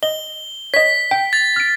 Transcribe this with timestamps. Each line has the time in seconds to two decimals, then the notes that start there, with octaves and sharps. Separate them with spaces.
0.03 D#5 G7
0.74 C#5 D#5 B6
1.11 G5
1.33 A6
1.56 F6 D7